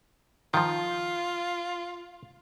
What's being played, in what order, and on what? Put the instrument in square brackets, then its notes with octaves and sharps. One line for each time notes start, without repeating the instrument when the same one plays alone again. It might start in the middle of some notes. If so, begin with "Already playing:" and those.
[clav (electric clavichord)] D#3 F3 [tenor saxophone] F4